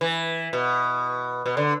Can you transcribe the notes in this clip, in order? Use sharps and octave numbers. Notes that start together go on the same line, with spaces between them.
E3
B2
B2
D3